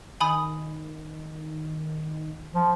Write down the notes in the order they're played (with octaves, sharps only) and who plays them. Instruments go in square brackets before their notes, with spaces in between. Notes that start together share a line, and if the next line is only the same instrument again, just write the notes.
[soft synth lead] D#3 [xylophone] G#5 B5 D#6
[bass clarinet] F3